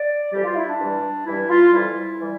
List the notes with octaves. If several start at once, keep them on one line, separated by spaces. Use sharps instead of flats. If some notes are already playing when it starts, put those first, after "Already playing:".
Already playing: D5
F2 E3 G3 G4
F4
E4
D4
G2 E3 G3
G2 E3 G3 E4
F4
F2 E3 G3 E4
E3 G3